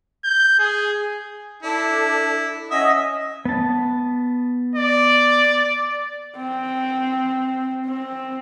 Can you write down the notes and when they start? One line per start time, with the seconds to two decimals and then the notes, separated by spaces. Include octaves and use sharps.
0.24 G6
0.59 G#4
1.63 D4 E4 A4
2.71 C#4 D#5 E5 F#5
3.45 B3 A5
4.75 D5
6.37 C4
7.86 C4